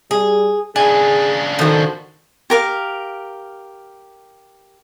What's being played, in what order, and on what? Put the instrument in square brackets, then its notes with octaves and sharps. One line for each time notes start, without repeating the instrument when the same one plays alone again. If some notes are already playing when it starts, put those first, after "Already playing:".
[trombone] G3 [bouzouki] G#4
[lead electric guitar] C#3 D4 [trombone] G#4 [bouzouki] G#5
[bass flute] D#3 [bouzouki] F3 F#4 [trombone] A4
[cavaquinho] G4 A#4 F5